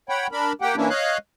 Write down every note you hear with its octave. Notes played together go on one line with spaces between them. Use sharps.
C#5 F#5 G5 B5
D4 A#4 B5
A#3 G4 F#5 G5
E3 A#3 C#4 D4 E4
C#5 D#5 F5 F#6